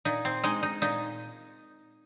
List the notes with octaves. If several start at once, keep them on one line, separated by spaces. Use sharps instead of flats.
A#2 D#4
C4
G#3 D#4
D#4
A#2 D#4